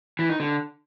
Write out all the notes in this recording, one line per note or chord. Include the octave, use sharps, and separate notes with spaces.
E3
D#4
D3